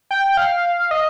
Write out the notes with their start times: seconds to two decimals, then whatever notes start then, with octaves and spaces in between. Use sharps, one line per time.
0.11 G5
0.37 F5
0.91 D#5